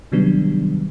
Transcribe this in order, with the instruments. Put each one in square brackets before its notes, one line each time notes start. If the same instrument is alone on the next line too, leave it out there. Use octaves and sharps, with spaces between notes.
[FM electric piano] C3 D#3 F#3 G3 B3 D4